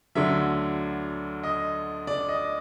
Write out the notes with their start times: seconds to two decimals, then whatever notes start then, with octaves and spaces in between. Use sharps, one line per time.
0.15 D2 D3 F#3 E5
1.43 D#5
2.07 D5
2.29 D#5